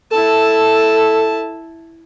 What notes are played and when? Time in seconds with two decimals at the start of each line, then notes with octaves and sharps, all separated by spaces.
0.12 E4 A4 A5